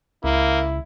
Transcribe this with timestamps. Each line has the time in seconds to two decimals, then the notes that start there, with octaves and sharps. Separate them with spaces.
0.24 C#2 A#3 E4